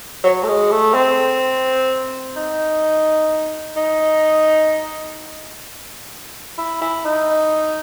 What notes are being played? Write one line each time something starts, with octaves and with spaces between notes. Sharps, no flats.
F#3
A3
G#3
A3
C4
D#4
D#4
E4
E4
D#4